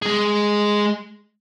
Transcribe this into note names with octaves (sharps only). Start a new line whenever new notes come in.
G#3 G#4